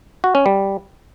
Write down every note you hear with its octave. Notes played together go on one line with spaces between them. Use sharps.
F#4
C#4
G3